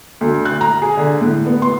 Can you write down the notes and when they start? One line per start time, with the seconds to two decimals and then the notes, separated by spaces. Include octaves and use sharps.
0.21 D2
0.45 F#6
0.61 A#5
0.82 G#4
0.97 D3
1.21 A2
1.47 B3
1.62 C6